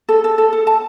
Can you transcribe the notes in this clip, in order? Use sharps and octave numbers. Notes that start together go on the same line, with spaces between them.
A4
A4
A4
A4
A5